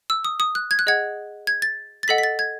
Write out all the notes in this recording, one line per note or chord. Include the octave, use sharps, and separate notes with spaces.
E6
D#6
D#6
F#6
G#6
F#6
G#4 D#5 F#5 G#6
G#6
A6
A6
A4 D#5 F#5 B6
B6
A6
G#6